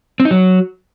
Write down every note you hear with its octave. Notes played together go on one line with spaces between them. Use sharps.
C4
D#4
F#3